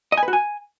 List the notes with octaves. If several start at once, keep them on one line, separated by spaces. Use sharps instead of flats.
D#5
G#5
B4
F#4
G#5